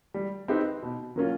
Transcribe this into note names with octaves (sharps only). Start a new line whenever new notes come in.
G3
C4 D#4 G4 B4
B2
F#3 A#3 C#4 F4